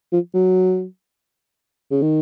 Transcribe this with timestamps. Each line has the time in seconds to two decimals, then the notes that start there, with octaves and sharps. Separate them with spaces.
0.13 F3
0.34 F#3
1.91 C#3
2.02 D#3